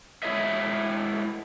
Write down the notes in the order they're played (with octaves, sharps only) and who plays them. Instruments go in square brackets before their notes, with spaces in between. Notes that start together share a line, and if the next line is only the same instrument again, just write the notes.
[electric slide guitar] G#3 E4 C#5 D#5 E5